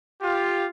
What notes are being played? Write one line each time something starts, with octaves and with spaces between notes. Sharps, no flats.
F4 G4